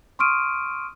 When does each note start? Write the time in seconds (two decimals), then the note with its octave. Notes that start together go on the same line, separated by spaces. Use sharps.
0.19 C6 C#6 D#6 F6 D7 D#7